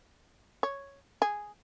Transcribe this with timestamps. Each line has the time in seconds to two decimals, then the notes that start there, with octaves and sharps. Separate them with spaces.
0.63 C#5
1.22 G#4